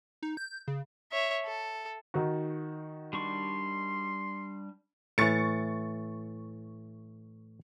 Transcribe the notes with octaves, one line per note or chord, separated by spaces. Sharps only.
D#4
G6
C#3
C#5 E5
A4
D#3 D#4 F#4
G3 D4 C6 C#6
A2 E3 C#6 A6 C#7